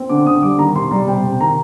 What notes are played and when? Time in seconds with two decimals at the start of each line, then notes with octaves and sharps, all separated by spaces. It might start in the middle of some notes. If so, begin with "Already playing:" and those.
Already playing: C4
0.09 D3 D6
0.26 D3 D#6
0.43 G3 D6
0.58 D#3 A#5
0.75 C3 C6
0.91 G3 A#5
1.07 C3 G5
1.24 C3
1.40 D#3 A#5